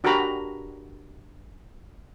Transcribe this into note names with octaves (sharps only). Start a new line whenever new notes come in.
D4 F#4 G4 A#4 A#5 B5